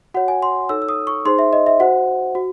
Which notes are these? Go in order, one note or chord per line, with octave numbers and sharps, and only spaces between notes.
F#4 C#5 F#5
G#5
C6
D#4 A4 C#5 E6
E6
D#6
C#6
D#4 G#4 C5 C6
E5
D#5
E5
F#4 C5 F#5
F#4